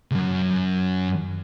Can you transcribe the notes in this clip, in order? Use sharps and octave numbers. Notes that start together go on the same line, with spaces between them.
C#2 F#2